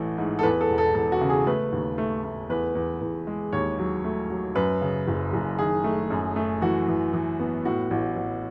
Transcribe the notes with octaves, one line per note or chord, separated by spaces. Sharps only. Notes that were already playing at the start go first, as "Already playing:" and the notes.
Already playing: A1 E3 A3
G#2
A4
E2 B4
A4
E1
A4
E1 A4
F#4
C#3
G#4
A3 B4
D#2
A3
A3
E2 B4
E2
E2
G#3
D#2 C#5
F#3
A3
F#3
F#2 B4
C#3
F#1
F#1
D#3 G#4
A3
F#2
A3
E3 F#4
E3
E3
B3
A2 F#4
A1
A1